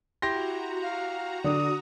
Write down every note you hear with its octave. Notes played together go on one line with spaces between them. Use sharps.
E4 F#4 G4 A#5 C6 A#6
F5
D3 D4 D#6